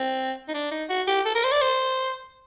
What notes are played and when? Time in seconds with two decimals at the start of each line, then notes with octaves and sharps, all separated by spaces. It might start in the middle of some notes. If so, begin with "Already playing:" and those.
Already playing: C4
0.48 D#4
0.54 D4
0.71 D#4
0.89 F#4
1.07 G4
1.25 A4
1.35 A#4
1.44 C5
1.52 D5
1.61 C5